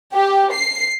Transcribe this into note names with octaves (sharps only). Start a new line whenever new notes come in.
G4
C7